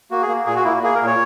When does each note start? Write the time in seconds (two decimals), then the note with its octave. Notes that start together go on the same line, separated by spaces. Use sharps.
0.11 A#3 F#4
0.22 G#4
0.28 A#3
0.46 A#2 G#4
0.56 F#4
0.64 A#3 E4
0.83 A#3 G#4
0.95 A#4
1.01 A#2
1.06 C#5